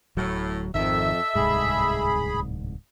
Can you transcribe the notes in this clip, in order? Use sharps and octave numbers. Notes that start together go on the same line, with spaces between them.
D1 A2 F#3
G#1 F2 D#3 A4 D#5 E5
D1 C2 G#2 G#4 B5